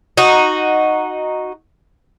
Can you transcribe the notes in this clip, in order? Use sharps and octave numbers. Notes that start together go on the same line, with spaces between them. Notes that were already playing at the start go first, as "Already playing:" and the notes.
D#4 F#4